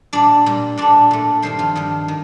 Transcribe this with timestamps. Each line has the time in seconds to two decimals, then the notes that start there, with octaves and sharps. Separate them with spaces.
0.13 A#2 G3 D4 D5
0.46 A#2 G3
0.78 A#2 A3 D4 D5
1.11 A#2 A3
1.42 G2 D#3 G3 C4 C5
1.59 F3 F4
1.75 G2 D#3 G3
2.08 D#3